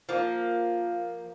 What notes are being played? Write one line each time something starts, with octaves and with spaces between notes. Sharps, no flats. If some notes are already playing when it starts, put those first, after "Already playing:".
F3 A#3